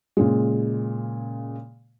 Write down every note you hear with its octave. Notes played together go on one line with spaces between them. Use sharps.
A#2 C#3 G#3